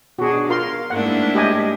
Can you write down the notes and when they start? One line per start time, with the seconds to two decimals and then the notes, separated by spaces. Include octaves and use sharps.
0.19 B2 D4 F#4 G#4
0.49 F4 A#4 F5 C6
0.90 G#2 A3 A#3 D4 E4 F#5
1.35 G4 D#5 G#5